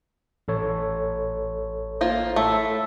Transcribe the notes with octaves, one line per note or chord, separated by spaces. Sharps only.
A1 A4 C#5
A#3 F4 C5
A2 A3 E5